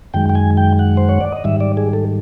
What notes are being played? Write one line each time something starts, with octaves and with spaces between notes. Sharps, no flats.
F#2 D#3 G#3 G5
G5
G#5
G5
F#5
C5
C#5
D5
D#5
G#2 D#3 G3 E5
D5
G#4
A4